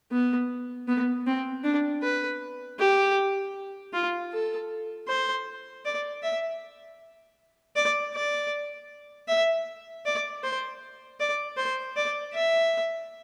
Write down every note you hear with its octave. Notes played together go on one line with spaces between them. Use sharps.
B3
B3
C4
D4
B4
G4
F4
A4
C5
D5
E5
D5
D5
E5
D5
C5
D5
C5
D5
E5